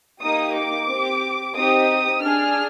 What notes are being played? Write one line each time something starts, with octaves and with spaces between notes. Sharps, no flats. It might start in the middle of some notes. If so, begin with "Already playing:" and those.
A#3 D#4 G4 D#6
D6
C4 G4
C4 D#4 G4 D#6
D4 G#4 F6